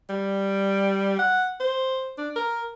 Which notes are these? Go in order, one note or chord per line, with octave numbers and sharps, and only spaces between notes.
G3
F#5
C5
D4
A#4